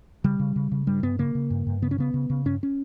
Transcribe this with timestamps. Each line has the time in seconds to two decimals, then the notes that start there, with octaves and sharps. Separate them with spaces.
0.24 C#3 G3
0.40 C#3
0.56 C#3
0.72 C#3
0.87 G2 G3
1.03 G2 B3
1.19 C#3 A#3
1.35 C#3
1.50 G2
1.67 G2
1.82 C#3 B3
1.91 C#4
1.98 C#3 B3
2.14 C#3
2.30 C#3
2.45 G2 C#4
2.63 C#4